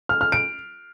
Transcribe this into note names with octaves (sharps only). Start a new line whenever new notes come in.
F6
F6
D7